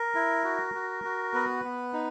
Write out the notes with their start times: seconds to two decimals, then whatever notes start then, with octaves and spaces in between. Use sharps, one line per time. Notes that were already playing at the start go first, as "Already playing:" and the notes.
Already playing: A#4
0.15 E4
0.44 F#4
0.74 F#4
1.04 F#4
1.34 B3 B4
1.64 B3
1.93 D#4